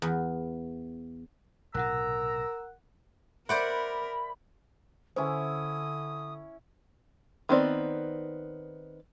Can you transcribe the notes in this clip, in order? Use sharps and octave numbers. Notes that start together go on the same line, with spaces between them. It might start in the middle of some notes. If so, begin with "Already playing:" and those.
E2
B1 A2 C3 A#4 F#5 A#5 E6 F#6
A#4 C5 D5 E5 F#5 B5 C6
D3 C#4 E4 C5 E5 G#5 D#6
D#3 B3 C4 D5